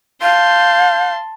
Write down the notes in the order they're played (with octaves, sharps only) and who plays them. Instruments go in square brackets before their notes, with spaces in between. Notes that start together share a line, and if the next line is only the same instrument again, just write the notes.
[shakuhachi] F5 [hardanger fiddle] A5 C6 [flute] G6